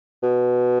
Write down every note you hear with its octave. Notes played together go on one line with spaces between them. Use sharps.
B2